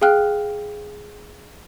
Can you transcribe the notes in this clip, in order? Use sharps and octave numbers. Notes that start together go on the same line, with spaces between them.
G#4 F5 G5 F6 F#6